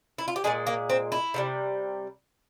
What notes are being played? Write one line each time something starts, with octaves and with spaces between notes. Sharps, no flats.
E4
F4
G4
A#2 F3 G#3 G#4
A#3
C4
E4
C3 E3 G3